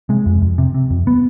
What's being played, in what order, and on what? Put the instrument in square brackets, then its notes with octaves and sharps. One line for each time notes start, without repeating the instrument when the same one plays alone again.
[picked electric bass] C3 G#3
F2
F2
C3
C3
F2
B3